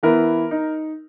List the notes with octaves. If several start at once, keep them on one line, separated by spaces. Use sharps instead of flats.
E3 B3 E4 A#4
D#4